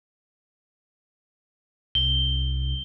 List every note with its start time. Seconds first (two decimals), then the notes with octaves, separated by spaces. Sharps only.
1.95 C2 G7